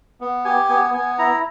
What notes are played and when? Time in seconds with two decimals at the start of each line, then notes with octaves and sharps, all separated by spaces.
0.21 B3
0.45 G4 G#5
0.69 B3 G#5
0.94 B3 G#5
1.18 E4 A#5